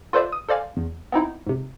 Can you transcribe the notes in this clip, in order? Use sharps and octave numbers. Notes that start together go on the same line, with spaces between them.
F4 A4 B4 C5 D5 E5
D#6
A4 C5 D5 F5 G#5
E2
B3 C4 D#4 E4
G#2 C3